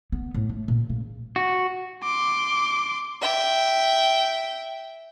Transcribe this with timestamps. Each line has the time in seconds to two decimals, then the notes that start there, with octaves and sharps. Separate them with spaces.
0.12 B3
0.34 A2
0.49 A3
0.68 A#2
0.90 C#3
1.36 F#4
2.03 C6 D6
3.22 E5 G5